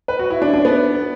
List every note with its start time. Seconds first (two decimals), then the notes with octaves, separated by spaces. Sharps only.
0.08 B4
0.19 F#4
0.30 E4
0.42 D4
0.54 D4
0.65 B3